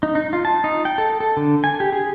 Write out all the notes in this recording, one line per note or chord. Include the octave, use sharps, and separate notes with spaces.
D#4
D#4
F4
A5
D#4
G5
A4
A4
D3
G#5
G4
G#4